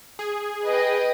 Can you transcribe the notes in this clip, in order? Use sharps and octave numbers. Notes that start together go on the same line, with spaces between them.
G#4
B4 D#5 G5